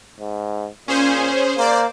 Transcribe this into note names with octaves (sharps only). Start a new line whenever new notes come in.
G#2
A#2 C#4 G#4 C5
A#3 C5 D5